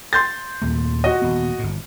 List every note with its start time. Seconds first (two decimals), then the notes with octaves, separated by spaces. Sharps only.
0.13 C6 G6 A6
0.62 D#2 A#2 A3
1.04 F#4 D#5
1.22 D#1 B3
1.59 G1 A2